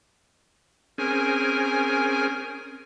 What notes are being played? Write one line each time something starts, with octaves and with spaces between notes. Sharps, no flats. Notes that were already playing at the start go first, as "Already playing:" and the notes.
C4 C#4 G#4 A#4 G#5